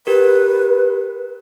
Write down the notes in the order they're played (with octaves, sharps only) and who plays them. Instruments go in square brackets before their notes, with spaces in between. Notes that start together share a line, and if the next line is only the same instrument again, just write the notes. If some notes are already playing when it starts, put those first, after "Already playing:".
[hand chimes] G4 A#4 [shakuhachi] B4